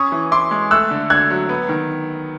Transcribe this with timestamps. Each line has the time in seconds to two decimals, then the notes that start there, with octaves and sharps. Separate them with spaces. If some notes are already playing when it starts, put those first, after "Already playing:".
Already playing: C#4 C#6 D#6
0.12 E3
0.31 E4 C6 D6
0.51 G#3
0.71 A3 E6 F#6
0.91 D3
1.10 D3 F#6 G#6
1.30 F#3
1.49 B3
1.69 D#3